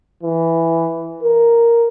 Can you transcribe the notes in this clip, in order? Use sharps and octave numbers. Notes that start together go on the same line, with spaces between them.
E3
A#4